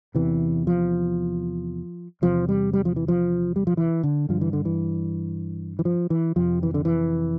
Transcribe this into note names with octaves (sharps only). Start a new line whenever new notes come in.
E2 C3 E3
F3
E2 C3 F3
G3
G3
F3
E3
F3
G3
F3
E3
D3
G2 D3 F3
E3
D3
E3
E3
F3
E3
F2 C3 F3
E3
D3
E3